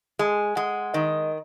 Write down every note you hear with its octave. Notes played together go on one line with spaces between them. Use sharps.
G#3 G#5
G#3 F#5
D#3 D#5